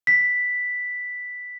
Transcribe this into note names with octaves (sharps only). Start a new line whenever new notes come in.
B6